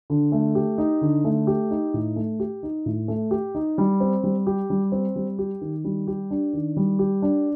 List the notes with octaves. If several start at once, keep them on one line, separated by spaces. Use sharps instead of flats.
D3
A3
G4
D#4
D3
A3
G4
D#4
A2
A3
G4
D#4
A2
A3
G4
D#4
G3
C4
G3
G4
G3
C4
G3
G4
D#3
G3
G4
D4
D#3
G3
G4
D4